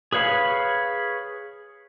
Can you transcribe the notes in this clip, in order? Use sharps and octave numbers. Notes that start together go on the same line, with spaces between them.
G#4 B4 C#5 F5 B5